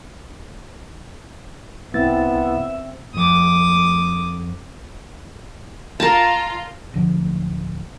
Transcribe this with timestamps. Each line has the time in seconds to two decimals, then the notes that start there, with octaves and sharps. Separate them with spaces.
1.94 C2 B3 C4 E4 E5 A6
3.15 F2 D6 D#6
6.00 F4 A#4 A5
6.94 D1 D3 F3